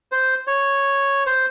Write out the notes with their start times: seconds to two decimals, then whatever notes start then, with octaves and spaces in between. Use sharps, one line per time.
0.12 C5
0.47 C#5
1.26 C5